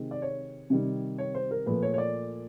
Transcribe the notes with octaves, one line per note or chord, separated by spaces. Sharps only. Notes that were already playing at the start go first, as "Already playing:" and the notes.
Already playing: C3 D#3 G#3 C4
D5
C#5
C3 D#3 G3
C#5
C5
A#4
A#2 F3 A3 B4
C#5
C#5
D5